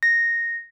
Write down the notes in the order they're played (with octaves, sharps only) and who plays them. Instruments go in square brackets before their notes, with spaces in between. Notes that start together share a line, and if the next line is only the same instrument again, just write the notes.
[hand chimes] A#6